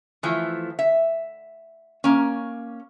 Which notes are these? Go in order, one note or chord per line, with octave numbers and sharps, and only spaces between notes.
E3 F3 A3
E5
A#3 C#4